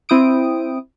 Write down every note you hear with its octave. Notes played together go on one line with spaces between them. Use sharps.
C4 E4 G5 D#6 D7